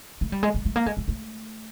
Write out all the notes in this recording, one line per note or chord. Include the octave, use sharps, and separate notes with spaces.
A3
G3
G#3
A3
A3
A#3
G#3
A3
A3